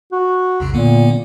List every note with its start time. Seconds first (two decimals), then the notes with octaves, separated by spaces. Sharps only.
0.12 F#4
0.60 B1 F2 C#3
0.74 A#2 D3 A#3 B3